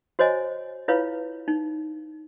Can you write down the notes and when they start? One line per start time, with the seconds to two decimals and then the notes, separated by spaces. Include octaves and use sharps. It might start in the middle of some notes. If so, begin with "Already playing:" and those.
0.19 F#4 C5 C#5 D#5 G#5
0.88 E4 F4 B4 C#5 F5
1.48 D#4